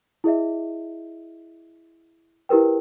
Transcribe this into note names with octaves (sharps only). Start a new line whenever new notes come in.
E4 G#4 D#5 E5
E4 G4 A#4 B4 G5